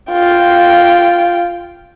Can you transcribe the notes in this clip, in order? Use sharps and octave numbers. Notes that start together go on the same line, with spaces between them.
F4 G5